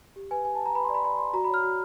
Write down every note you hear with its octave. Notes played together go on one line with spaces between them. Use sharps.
G4
B4 G#5
G4 G#5
A5
B4
A#5
B4 B5
C6
D5
B5
D5 B5
D5 C6
F#4 A#5
B5
C#5 F6
F#4